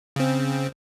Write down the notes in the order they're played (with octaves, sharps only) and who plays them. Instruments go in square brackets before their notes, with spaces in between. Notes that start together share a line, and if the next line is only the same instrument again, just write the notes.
[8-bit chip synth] C#3 C4